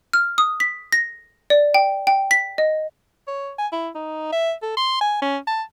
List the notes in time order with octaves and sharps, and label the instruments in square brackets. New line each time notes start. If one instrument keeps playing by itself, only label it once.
[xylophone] F6
D#6
B6
A#6
D5
G5
G5
B6
D#5
[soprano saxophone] C#5
G#5
E4
D#4
E5
A4
C6
G#5
C#4
A5